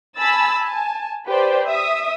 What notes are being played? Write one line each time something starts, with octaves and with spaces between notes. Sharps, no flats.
G#5 A5 B5 E6 A6
G#5 A5
G4 B4 C5 D5
E5 D#6